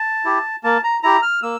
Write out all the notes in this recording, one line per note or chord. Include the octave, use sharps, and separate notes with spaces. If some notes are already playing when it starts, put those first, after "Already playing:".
Already playing: A5
E4 G4
A#3 A5
A#5
E4 G4 A#5
F6
A#3 E6